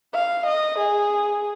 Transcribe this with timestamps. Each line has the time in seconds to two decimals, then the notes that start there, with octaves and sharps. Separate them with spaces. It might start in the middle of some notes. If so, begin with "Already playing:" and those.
0.14 F5
0.46 D#5
0.78 G#4